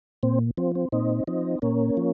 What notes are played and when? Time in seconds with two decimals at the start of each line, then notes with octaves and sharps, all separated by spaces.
0.23 A#2 C4
0.57 F3 C4
0.75 C4
0.92 A#2 C4 D#4
1.27 F3 C4 D#4
1.62 A#2 A#3 C#4
1.97 F3